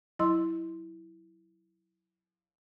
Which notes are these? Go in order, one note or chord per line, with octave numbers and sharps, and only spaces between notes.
F#3 E4 D#5 C6 E6